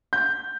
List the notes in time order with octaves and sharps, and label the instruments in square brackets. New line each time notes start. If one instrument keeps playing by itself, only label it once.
[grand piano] G6